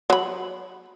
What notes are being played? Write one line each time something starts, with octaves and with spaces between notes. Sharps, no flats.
F#3 B5